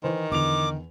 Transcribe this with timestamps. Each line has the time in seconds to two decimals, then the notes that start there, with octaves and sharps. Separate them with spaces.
0.03 D#3 E3 E4 C5
0.32 E2 D3 D6 F7